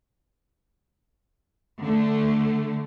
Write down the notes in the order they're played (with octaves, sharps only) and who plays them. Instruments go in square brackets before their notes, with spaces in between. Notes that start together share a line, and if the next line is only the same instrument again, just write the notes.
[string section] D3 A3